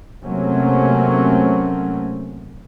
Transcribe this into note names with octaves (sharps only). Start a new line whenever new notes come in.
C3 F#3 A3 A#3 C4 C#4